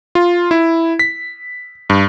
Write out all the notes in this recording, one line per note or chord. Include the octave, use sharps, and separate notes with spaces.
F4
E4
B6
G2